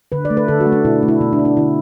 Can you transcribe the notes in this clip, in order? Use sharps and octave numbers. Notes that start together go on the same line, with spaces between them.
D3 B4
D5
A3
B4
D3 A4
F#4
A3
D4
B2 E4
A3
E4
B2 B3
D4
A3
D4
D3 E4